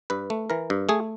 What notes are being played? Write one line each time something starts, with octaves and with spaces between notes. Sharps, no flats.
G2 B4
A3
E3 A#4
G2
A3 G#4